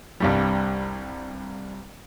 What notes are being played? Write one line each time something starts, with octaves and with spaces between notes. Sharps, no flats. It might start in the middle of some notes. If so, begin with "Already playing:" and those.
C2 G2 G3